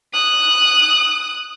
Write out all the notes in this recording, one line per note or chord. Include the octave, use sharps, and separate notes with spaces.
D#6 F#6